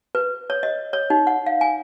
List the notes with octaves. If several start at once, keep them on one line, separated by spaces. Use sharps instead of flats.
B4
C#5
D#5
C#5
D#4
F#5
F5
G#5